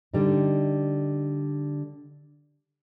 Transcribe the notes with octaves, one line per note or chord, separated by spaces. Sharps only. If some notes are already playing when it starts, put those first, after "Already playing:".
D3 G3 D#4